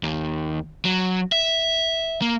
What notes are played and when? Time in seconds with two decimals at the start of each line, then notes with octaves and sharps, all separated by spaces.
0.03 D#2
0.85 F#3
1.32 E5
2.22 A#3